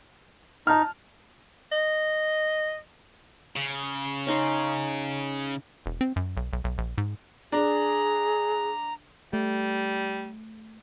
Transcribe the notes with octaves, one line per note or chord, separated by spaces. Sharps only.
D#4 A5 F6
D#5
C#3
C#4 D#4 C6
E1
C4
F#2
B1
B1
B1
A#1
G#2
D4 G#4 A#5
G3 A3